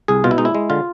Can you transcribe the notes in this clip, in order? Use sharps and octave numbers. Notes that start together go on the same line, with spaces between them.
C2 G#4
B2 F4
E4
G#3 D#4
E4
G#3
D3 F4